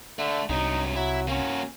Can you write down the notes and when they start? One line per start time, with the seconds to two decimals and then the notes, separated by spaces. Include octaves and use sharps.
0.19 D3 A3
0.49 C2 G2 F#3 D#4
0.95 F#3 E4
1.28 A#3 C#4 F#4